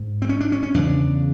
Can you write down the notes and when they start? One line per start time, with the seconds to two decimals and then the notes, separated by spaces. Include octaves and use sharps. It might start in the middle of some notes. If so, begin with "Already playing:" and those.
Already playing: G#2
0.22 C4
0.29 C#4
0.40 D4
0.52 C#4
0.63 C#4
0.74 E2 C#3 D4